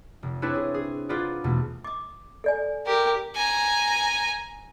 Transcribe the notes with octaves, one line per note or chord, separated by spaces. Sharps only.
F1
C4 D4 E4 A4 B4 C#5
G#4
G#4
F4 G#4 A#4 B4 D5 F#5
E2 B2 A3
D6 D#6
A4 D5 G#5
G4 A#4
G#5 A#5